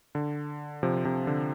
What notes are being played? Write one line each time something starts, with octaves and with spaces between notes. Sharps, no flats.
D3
C3 F3
C3
D3